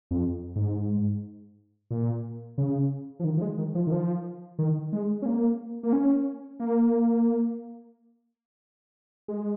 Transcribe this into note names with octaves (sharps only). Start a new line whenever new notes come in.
F2
G#2
A#2
C#3
F3
D#3
F3
G#3
D#3
F3
D#3
F3
D#3
G#3
C#4
A#3
A#3
C#4
A#3
G#3